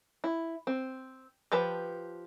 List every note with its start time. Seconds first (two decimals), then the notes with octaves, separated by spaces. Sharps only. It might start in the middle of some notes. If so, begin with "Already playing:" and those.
0.24 E4
0.67 C4
1.52 F3 G4 B4 A5